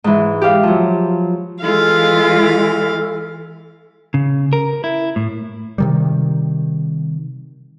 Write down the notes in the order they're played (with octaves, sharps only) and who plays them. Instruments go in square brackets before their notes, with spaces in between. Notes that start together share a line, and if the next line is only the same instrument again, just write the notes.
[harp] G#2 E3
G4 F5
F3 F#3
[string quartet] E3 [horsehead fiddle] G#3 F4 [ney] A4 [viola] F5
[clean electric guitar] C#3
A#4
E4
A2
[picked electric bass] C3 D#3 G3